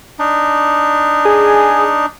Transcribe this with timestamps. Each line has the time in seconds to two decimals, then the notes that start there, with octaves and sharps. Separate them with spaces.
0.19 D4 D#4
1.25 G#4